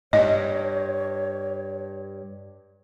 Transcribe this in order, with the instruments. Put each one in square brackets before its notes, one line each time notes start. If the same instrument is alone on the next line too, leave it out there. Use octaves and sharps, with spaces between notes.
[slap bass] G2 [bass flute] C#5 [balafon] D#5